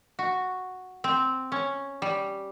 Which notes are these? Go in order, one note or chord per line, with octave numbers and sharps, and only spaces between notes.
F#4
C4
C#4
G3